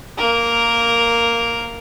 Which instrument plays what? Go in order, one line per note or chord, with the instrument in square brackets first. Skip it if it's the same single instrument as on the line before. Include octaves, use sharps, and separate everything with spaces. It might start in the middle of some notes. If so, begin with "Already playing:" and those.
[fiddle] A#3 A#4